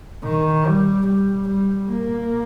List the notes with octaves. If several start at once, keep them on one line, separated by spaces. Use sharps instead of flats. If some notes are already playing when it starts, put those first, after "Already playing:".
D#3
G3
G3
G3
A#3